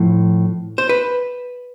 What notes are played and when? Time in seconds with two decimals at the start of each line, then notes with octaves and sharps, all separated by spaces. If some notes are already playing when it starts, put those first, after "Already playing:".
Already playing: A2 F3
0.78 C5
0.89 B4